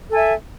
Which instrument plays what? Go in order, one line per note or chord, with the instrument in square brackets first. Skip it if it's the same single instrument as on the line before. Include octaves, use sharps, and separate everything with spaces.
[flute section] A4
G#5
E5